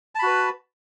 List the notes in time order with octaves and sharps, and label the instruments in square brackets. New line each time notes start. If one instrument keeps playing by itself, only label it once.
[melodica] A5
B5
F#4
B4